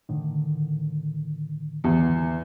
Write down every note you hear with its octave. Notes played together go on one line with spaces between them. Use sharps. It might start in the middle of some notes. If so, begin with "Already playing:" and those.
A2 D3 D#3
E2